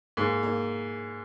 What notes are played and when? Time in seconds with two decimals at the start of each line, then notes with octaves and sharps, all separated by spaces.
0.17 G#2 A#3
0.43 A#3